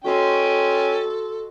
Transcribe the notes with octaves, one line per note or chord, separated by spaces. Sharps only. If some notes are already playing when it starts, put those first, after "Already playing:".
C#4 F#4 A4 D#5 G5 C6